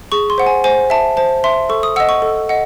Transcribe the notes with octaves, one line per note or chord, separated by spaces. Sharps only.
G#4 C#6
C6
C5 F#5
G#5
C5 G#5
E5 A5
C5 A5
E5 C6
A4 C#6
D#6
D#5 F#5 E6
C#6
A4
D#5 F#5